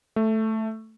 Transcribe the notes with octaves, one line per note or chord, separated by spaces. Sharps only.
A3